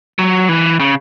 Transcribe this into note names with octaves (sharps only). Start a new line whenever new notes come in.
F#3
E3
C#3